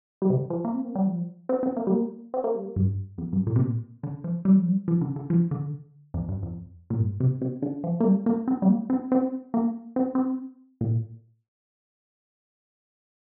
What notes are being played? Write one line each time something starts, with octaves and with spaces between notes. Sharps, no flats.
G3
C3
D3
F3
A#3
C4
A#3
G3
F3
C4
C4
A#3
G3
A#3
C4
A#3
G3
A#3
G2
F2
G2
A#2
C3
A#2
D3
F3
G3
F3
G3
F3
D3
D3
F3
D3
F2
G2
F2
A#2
G2
C3
C3
D3
F3
A#3
G3
A#3
C4
G3
A#3
C4
C4
A#3
C4
C4
A#2